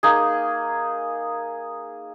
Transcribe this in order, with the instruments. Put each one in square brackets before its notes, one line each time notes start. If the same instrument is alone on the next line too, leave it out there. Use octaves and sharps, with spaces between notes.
[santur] A#3 D#4 G#4